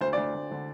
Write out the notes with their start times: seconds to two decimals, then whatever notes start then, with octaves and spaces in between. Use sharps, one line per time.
0.01 D2 C5
0.13 D5
0.17 D2
0.34 D2
0.51 D3